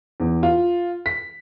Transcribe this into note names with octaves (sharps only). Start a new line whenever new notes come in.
E2
F4
B6